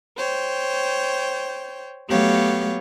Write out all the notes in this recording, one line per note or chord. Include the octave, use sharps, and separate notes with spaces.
C5 C#5 G5
F#3 A3 B3 G4 C#5 F5